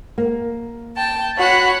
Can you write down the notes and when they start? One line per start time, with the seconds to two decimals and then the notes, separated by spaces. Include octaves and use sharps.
0.18 A#3
0.97 G5 A5
1.38 F#4 C#5 F#5 B5